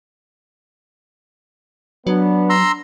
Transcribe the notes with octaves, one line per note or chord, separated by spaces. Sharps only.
F#3 B3 D4
A#5 C6 E6